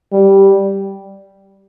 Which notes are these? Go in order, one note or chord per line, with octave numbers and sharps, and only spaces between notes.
G3